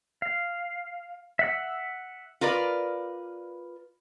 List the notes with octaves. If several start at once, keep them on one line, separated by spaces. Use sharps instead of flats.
F5
E5 F#5 E6
F4 A#4 B4 D5